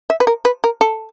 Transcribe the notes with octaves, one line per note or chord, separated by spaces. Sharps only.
E5
B4
A#4
B4
A#4
A4